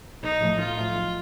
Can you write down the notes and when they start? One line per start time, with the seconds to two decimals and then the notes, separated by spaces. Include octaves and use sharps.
0.22 B1 D#4
0.41 A2 F3 A3
0.59 B1 F4
0.77 A2 F3 A3
0.95 B1